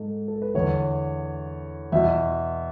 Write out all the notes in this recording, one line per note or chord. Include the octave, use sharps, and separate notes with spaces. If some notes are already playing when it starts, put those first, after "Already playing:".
Already playing: G#2 A4
A4
B4
E2 D3 C#5
E2 B2 E5